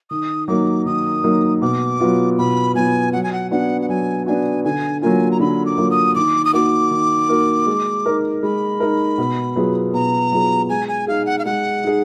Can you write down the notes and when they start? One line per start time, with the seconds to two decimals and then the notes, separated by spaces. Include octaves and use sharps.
0.10 D#3 D#6
0.48 F#3 A#3 D#4 D6
0.86 D#3 D#6
1.24 F#3 A#3 D#4
1.62 B2 D6
2.00 F#3 B3 F4
2.38 B2 B5
2.75 F#3 B3 F4 G#5
3.13 F#3 F#5
3.23 G#5
3.33 F#5
3.51 B3 D4 F#4 F#5
3.81 F#5
3.89 F#3 G#5
4.26 B3 D4 F#4 G#5
4.64 D3 G#5
5.02 F#3 A#3 F4 G#5
5.31 A#5
5.40 D3 B5
5.65 D6
5.78 F#3 A#3 F4
5.91 D#6
6.15 D#3 D6
6.45 D#6
6.53 A#3 D#4 F#4 A#4 D6
6.91 D#3
7.29 A#3 D#4 F#4 A#4
7.67 G#3
8.06 D#4 A#4
8.43 G#3 B5
8.80 D#4 A#4
9.18 B2
9.56 F#3 B3 F4 G#4
9.93 B2 A#5
10.32 F#3 B3 F4 G#4
10.70 G#3 G#5
10.88 G#5
11.07 D#4 G#4 F5
11.26 F#5
11.39 F5
11.45 G#3 F#5
11.84 D#4 G#4